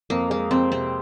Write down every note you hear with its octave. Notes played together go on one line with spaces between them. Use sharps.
F2 A#3
G#3 A#3
F2 C4
C3 C4